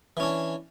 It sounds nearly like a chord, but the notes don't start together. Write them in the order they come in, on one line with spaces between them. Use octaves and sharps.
E3 C#4 D4